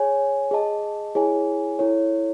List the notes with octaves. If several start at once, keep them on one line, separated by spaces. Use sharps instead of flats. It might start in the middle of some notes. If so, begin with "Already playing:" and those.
Already playing: G#4 C#5 G#5
G#4 D#5 A5
E4 G#4 C#5 G#5
E4 A4 C#5